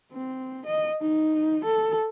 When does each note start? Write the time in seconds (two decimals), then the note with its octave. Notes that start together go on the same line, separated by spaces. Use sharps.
0.13 C4
0.66 D#5
1.01 D#4
1.65 A4